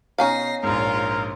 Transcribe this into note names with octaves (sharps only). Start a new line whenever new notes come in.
B2 C#4 D#4 F5 A#6 C7
A#1 G#2 F4 A#4 C#5